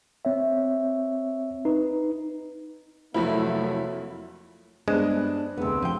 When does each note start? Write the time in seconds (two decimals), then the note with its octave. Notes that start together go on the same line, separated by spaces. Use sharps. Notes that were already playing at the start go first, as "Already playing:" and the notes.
0.25 C4 C#5 E5
1.65 D#4 B4
3.14 F1 F3 F#3 A3 A#3 E4
4.88 G2 G#3 B3 D4 C5 F#6
5.58 F1 D2 B3 C4 G#4
5.82 F3 G5